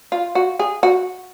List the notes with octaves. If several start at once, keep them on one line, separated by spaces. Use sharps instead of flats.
F4
F#4
G#4
F#4